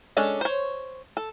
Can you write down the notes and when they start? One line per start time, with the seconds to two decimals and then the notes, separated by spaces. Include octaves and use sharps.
0.17 G#3 C#4 D4 A4
0.41 C5 C#5
1.17 A4